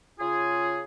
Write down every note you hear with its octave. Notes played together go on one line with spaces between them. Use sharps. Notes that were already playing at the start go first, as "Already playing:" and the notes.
C#3 F4 G#4